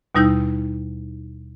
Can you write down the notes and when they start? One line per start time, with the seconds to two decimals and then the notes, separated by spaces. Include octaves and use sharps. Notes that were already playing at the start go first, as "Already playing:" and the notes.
0.15 D#2 B2 G3 D#4 E4 G6